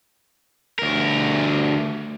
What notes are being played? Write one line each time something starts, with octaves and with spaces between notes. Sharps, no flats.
D2 A#4